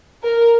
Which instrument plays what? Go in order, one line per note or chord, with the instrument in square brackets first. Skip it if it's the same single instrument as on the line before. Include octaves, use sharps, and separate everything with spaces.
[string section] A#4